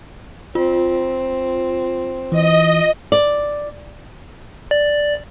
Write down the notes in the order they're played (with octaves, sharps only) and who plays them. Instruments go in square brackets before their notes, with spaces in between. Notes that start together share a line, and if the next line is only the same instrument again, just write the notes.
[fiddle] C4 [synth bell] F4
[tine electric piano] E3 [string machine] D#5
[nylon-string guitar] D5
[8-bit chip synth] D5